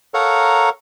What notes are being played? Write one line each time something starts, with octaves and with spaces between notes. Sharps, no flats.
A4 A#4 C#5 F5 F#5 A#5